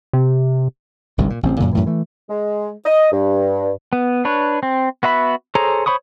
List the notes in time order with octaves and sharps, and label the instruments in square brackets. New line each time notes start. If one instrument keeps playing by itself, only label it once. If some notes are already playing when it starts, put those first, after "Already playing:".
[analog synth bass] C3
[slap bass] G1 C2 G#2 C3
A#2
A1 C#3 C4
F#2 A#2 D3
F#2 A2 E3
E3 A3
[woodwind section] G#3
D#5
G2
[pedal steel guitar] B3
D4 B4 C#5
C4
B3 F#4 E5 B5
G#4 A4 C5 C#5 A#5
C5 C#5 B5 C#6 D#6